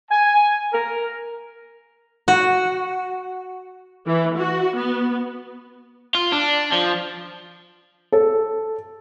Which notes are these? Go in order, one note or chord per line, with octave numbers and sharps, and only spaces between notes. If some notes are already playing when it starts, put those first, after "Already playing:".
G#5
A#4
F#4
E3
F#4
B3
F4
D4
F3
A4